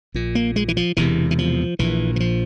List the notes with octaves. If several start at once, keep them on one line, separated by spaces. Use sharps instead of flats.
A#1 A#2
A#3
G#3
E3
F3
E1 E2 C3 E3
E3
F3
A#1 A#2 E3
E3
F3